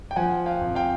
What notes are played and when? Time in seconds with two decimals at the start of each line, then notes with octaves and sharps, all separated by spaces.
0.11 G5
0.16 F3 F#5 G#5
0.46 F5 G5
0.61 F2
0.75 F5 G5